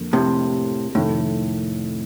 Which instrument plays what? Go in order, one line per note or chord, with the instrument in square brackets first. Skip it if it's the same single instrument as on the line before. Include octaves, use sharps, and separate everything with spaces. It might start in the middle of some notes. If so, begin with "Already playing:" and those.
Already playing: [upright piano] F2 D3 F3 A#3
[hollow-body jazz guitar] A2 C3
[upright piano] F2 C3 D#3 A3 [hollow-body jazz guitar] A2